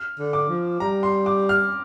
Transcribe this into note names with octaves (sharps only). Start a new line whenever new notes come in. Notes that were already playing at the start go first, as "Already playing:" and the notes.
Already playing: F6
D3
D6
F3
G3 A#5
C6
D6
F6